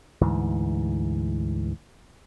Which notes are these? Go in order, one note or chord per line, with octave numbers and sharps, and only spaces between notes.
D2 G#2 E3